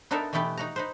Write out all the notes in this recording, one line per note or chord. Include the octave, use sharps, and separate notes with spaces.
B3 D4 D#4 A4 A#4 E5
B2 E3 A3 B3 G4 B4
D#4 F#4 A#5
D#4 B4 C5